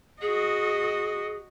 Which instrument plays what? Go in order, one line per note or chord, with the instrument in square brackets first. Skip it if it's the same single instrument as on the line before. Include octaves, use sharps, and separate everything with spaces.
[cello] F#4 D#5 [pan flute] G#4